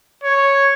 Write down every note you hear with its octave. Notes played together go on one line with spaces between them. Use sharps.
C#5